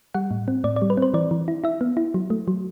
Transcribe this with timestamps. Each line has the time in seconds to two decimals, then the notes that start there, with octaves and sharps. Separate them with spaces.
0.14 G3 F#5
0.31 A2
0.48 C4
0.64 A2 D5
0.76 D5
0.82 G3
0.90 B4
0.97 C4 C5
1.14 E3 D5
1.31 E3
1.48 E4
1.64 E4 E5
1.81 B3
1.97 E4
2.14 F#3
2.30 A3
2.48 F#3